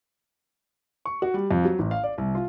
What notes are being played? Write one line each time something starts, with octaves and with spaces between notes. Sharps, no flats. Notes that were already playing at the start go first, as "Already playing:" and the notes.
C#6
F#4
G3
F2
F#3
A1
F5
D5
C2
F4